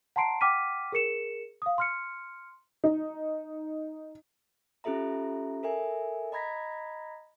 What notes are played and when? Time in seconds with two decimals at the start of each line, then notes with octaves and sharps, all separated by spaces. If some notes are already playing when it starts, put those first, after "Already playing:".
0.16 F#5 A5 A#5 C6 C7 D7
0.41 F#5 G5 D6 F6 B6 D#7
0.92 G#4 A#4 C#7 E7
1.62 F5 D#6
1.78 C6 F6 C#7
2.84 D#4
4.84 C#4 F4 G4 A4 E5 A#5
5.63 A4 A#4 E5 G#5
6.32 D#5 A#5 B5 G#6 A#6 B6